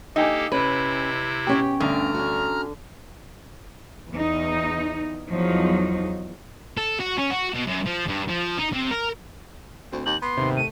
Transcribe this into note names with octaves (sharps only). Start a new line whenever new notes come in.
A#3 D#4 G4 A4 D#5 G5 G#5
C3 C#4 E4 B4
B2 C#4 G4 G5
D2 G2 D3 A#5 F6
C#4 F#4
E2 D#4
E2 F3 F#3 D#4
A4
F#4
C#4
F#4
B2
F#2
F3
G2
F3
D#4
C3
A#4
D2 C4
D#2 G6 F#7
B3 C6
D#2 G#2 C3 G7
A3 D#7